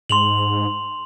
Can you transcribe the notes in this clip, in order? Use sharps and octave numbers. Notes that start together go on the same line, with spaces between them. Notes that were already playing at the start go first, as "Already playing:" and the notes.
G#2 C6 F7 F#7